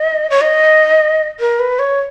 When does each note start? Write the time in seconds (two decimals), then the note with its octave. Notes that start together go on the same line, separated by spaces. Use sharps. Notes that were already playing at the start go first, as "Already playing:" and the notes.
Already playing: D#5
0.30 C#5
0.41 D#5
1.40 A#4
1.59 B4
1.79 C#5